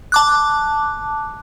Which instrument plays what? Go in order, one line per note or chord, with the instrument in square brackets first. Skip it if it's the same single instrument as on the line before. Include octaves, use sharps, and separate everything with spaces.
[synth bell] A5 D6 F#6